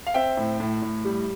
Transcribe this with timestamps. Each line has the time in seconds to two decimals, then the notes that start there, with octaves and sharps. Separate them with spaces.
0.07 F5
0.14 C4 E5 G5
0.37 A2
0.60 A2
0.82 A2
1.05 G3